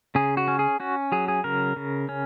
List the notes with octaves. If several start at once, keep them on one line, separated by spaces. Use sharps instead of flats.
C#3 G#4
F#4
C#4
G#4
C#4 F#4
F#3 G#4
G#4
C#3 A#4
C#3
C#4